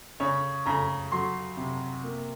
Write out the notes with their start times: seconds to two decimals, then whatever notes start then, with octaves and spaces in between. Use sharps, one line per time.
0.20 C#3 C#5
0.66 C#3 A#5
1.12 F#3 C6
1.57 C3
2.04 A#3